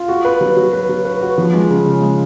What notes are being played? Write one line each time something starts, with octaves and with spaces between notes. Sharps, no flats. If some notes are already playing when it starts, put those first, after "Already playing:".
Already playing: F4
F#4
B4
F#3
F#3
B4
F#3
B4
F#4
F3
G#3
C#3
C#3
G#3